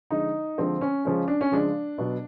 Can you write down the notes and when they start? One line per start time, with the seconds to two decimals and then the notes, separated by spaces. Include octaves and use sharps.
0.11 D3 F3 G#3 D#4
0.58 D3 F3 G#3 C4
0.81 C#4
1.05 C#3 F3 G#3 C#4
1.28 D4
1.41 C#4
1.51 C#3 F3 G#3 D4
1.98 B2 F#3